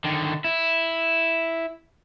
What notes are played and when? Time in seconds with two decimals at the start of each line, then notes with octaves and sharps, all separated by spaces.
0.04 D3 D#3
0.44 E4